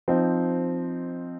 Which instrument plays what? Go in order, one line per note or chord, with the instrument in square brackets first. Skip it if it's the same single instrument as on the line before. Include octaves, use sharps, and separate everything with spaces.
[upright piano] F3 C4 D#4